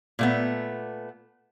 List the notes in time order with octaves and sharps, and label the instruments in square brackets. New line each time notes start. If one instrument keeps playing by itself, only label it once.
[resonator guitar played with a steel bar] A#2 A3 B3